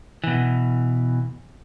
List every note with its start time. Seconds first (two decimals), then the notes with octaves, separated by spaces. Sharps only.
0.24 B2 E3